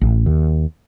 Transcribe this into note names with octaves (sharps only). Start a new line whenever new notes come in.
A1
D#2